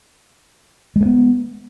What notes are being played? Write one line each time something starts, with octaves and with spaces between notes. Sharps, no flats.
G#3 A3 B3